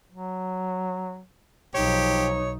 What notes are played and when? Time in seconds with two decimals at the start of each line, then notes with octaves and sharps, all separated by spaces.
0.12 F#3
1.75 B1 F3 D#4 G4 C#5